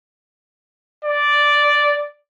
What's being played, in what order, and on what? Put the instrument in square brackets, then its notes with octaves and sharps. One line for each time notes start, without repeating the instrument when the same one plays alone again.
[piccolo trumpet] D5